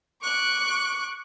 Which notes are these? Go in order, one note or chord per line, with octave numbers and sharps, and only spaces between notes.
C#6 D6 F#6